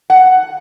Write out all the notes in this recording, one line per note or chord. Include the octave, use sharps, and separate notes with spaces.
F#5